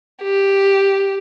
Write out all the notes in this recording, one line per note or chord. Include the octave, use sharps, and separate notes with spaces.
G4